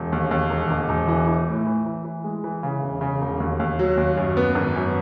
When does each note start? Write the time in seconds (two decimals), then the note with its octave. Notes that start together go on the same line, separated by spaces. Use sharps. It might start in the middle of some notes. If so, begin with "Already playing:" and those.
Already playing: E1
0.12 D#2
0.31 D#2
0.50 E1
0.71 E1
0.89 E1
1.08 E3
1.27 E3
1.48 A2
1.66 E3
1.86 E3
2.05 E3
2.24 G#3
2.44 E3
2.63 C#3
2.82 E1
3.01 C#3
3.21 E1
3.40 D#2
3.59 D#2
3.79 F#3
3.97 D#2
4.17 F#2
4.37 B3
4.55 G#1
4.76 F#2